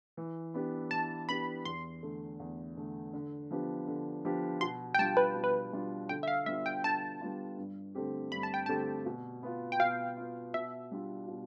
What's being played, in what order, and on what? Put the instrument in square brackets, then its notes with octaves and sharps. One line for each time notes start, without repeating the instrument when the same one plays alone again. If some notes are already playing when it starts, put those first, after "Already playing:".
[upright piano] E3
B3 D4 G4
[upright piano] E3 [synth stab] A5
[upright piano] B3 D4 G4 [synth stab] B5
[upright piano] E2 [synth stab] C6
[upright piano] D3 A3
E2
D3 A3
D3
F3 B3 D4 G4
D3
F3 B3 D4 G4
[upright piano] B2 [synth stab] C6
[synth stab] G5
[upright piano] G3 D4 F4 [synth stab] A5
[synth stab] B4
[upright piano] B2
[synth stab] B4
[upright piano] G3 D4 F4
[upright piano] D3 [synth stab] G5
[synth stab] E5
F5
[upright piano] G3 B3 D4 F4 [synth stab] E5
[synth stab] G5
[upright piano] D3 [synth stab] A5
[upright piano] G3 B3 D4 F4
G2
D3 A3 C4 G4
[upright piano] G2 [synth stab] B5
[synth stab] A5
G5
[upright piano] D3 A3 C4 G4 [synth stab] A5
[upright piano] B2
B3 F4
[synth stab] G5
[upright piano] B2 [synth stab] F5
[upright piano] B3 F4
[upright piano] B2 [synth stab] E5
[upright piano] G3 D4 F4
B2